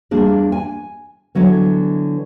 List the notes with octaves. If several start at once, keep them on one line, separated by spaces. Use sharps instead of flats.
E2 G3 A#3 D4 G#4
G#5
D3 E3 F#3 B3